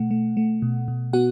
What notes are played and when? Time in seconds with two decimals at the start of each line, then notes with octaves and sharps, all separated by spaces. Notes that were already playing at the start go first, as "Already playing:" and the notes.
Already playing: B2 A3 F#5
0.11 A3
0.37 A3
0.62 B2
0.88 B2
1.13 B3 F#4 F#5